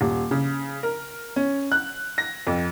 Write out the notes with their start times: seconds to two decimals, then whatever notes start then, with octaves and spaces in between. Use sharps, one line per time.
0.01 D#1
0.31 C#3
0.83 A#4
1.36 C#4
1.72 F#6
2.18 A#6
2.47 F2